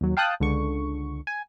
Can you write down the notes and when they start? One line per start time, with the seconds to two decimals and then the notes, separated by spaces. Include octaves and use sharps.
0.01 D#2 F#3
0.17 F5 G5 A5 D#6 F#6
0.40 C#2 D3 C#6
1.27 G#5